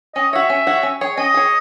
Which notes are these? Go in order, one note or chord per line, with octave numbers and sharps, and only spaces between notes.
C#4 D#5
F#4 C#5 E5
C#4
F#4 C#5
C#4
G#4 C#5
C#4 D#5
G#4 C#5